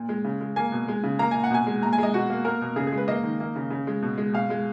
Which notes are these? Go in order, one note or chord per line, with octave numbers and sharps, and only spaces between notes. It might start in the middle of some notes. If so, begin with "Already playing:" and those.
Already playing: A#2
G#3
C#3
G#3
A#3 G#5
B2
G#3
C#3
A#3 A#5
A#2 G#5
F#5
B2 G#5
G#3
A#2 A#5
G#5
G#3 D#5
B2 F#4
A#3
A#3 A#4
B2
C#3 G#4
G#4
G#3
B4
A#3 D#5
D#3
A#3
C#3
C#3
G#3
B2
G#3
B2 F5
G#3